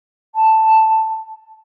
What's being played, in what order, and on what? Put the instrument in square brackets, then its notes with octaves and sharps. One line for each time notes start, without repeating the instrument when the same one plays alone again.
[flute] A5